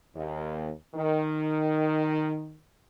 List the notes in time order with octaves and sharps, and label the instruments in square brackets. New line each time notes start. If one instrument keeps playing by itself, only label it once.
[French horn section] D#2
D#3